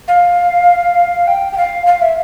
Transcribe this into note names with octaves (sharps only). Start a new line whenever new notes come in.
F5
G5
G5
F5
F5
E5